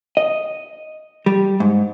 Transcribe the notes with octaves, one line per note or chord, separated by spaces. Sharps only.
D#5
G3
G#2